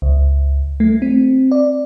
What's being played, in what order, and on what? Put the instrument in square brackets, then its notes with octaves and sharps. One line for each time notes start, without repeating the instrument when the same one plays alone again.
[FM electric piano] C#2
A3
C4
D5